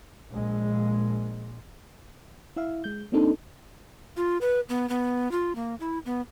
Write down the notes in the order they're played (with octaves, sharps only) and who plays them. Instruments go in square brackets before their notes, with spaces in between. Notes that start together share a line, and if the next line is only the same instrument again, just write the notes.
[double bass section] A#1 G#3
[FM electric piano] E4 E5 F5
G#3 G6
A#3 C4 D4 D#4 A4
[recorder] F4
B4
B3
B3
F4
A#3
E4
B3